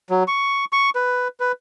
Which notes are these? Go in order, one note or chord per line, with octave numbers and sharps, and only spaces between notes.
F#3
C#6
C#6
B4
B4